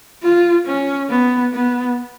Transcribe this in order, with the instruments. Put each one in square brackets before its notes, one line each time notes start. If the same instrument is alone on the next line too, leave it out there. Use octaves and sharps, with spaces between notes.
[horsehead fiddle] F4
C#4
B3
B3